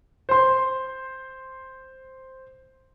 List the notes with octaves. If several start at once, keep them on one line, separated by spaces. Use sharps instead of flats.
C5 C6